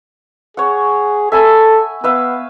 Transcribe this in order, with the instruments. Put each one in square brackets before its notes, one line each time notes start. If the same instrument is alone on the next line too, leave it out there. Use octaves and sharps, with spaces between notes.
[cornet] G#4 [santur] C#5 F#5
[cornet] A4 [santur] E5 G#5 B5
[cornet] B3 [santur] B4 E5 F5